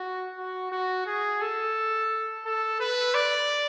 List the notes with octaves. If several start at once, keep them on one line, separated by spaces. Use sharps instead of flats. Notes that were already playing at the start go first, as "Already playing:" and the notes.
Already playing: F#4
F#4
F#4
G#4
A4
A4
B4
D5